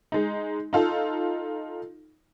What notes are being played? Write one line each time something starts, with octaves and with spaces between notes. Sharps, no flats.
G#3 D#4
D#4 F4 A4